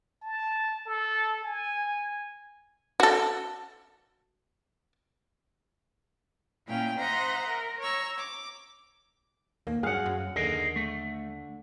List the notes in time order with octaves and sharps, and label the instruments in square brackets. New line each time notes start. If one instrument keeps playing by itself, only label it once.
[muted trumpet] A5
A4
G#5
[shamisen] F#4 A4
[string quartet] A#2 C#4 E4 F5 G5
C5 D#5 E5 F#5 A#5 C6
A#4
C#5 A#5 C#6 E6
D6
[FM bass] D#2 [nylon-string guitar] A#3
[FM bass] G2 [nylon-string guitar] F#3 G#4 [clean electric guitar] F5 F#5
[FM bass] F#2
[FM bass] D#2 [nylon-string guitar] D3 [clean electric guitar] G#4 A#4 D#5
[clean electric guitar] A3